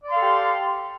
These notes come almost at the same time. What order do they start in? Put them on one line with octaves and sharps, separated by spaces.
D5 C6 F5 A4 G4